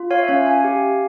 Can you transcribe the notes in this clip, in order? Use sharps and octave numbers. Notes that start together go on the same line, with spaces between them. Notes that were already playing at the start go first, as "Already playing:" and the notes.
Already playing: F4
C#5 F5
E5
C#4 C#5 F5
F5 G#5
G4